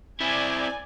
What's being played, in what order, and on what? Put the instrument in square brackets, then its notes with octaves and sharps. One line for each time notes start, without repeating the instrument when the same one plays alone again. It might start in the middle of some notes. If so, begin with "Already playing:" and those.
[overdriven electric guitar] C4 E4 [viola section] D5 G#5